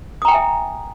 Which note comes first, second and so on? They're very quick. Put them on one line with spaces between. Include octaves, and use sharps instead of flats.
D#6 A#5 G5 G#5 E5